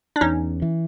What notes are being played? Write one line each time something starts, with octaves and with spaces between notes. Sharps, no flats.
D4
E2 C#4 D#4
E3